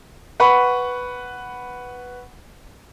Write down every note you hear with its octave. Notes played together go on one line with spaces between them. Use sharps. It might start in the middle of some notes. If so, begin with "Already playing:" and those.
B4 F#5 B5 C#6